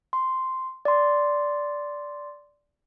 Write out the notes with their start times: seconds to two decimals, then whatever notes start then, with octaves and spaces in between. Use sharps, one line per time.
0.13 C6
0.85 D5 C6